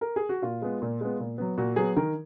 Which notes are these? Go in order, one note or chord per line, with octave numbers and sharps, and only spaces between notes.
A#4
G#4
F#4
A#2 F4
G#3 B3
A#2
G#3 B3
A#2
F#3 B3
A#2 F#4
F#3 B3 G#4
D#3 A#4